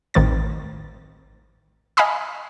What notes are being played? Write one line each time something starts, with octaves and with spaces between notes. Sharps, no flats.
A1 D#3 C4 A6
D#5 F5 G#5 A#5 B5 D#6